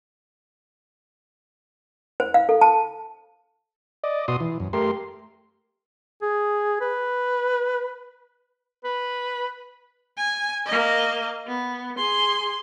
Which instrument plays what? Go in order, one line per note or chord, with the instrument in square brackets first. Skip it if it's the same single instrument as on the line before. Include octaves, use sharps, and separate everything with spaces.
[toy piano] C5
F5
A4
A5
[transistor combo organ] D5 D#5
B2 F#4 C6 D#6
E3
F#2
A3 G4 A#4 C6
[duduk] G#4
B4
[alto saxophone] B4
[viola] G#5
A#3 D#5
B3
G#4 C6